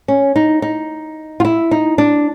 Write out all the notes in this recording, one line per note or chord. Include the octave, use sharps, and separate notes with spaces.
C#4
D#4
D#4
F4
E4
D#4
D4